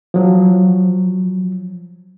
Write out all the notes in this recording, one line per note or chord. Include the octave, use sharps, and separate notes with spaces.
F3 F#3